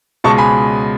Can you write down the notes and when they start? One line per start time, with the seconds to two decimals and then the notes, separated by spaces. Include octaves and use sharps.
0.24 C#2 B2 G#3 A5 C#6
0.38 G#5 B5